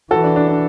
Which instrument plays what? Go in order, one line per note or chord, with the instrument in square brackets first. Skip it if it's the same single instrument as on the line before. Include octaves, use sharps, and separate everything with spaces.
[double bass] E3 [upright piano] F#4 A4
[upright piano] D4
D4
D4